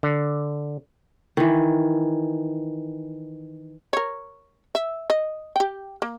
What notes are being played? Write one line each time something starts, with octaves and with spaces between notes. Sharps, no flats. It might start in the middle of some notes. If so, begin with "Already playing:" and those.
D3
D#3 E3
A#4 C#5
E5
D#5
G4 G5
A#3